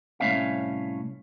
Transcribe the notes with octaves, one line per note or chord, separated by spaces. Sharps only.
C2 A2 A3 C#4 E5 F5